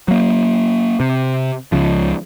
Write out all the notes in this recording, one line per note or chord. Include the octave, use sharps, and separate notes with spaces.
F#3 A#3
C3
C#2 C#3 F3